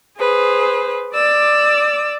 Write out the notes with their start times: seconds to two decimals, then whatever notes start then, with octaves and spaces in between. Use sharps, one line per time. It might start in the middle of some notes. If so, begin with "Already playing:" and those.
0.17 G#4 B4 C5
1.14 D5 D6 E6